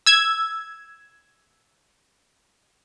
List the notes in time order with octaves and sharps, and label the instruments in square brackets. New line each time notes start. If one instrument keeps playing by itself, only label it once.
[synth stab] E6 G#6